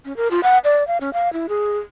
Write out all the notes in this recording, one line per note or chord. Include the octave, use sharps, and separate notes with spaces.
C#4
A#4
F4
F#5
D5
F5
C#4
F5
E4
G#4